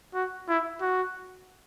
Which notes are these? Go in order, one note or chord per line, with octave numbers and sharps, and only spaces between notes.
F#4
E4
F#4